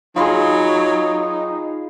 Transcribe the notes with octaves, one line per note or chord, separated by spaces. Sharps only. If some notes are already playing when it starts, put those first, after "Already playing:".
F#3 D#4 F4 G#4 F5 B5 C6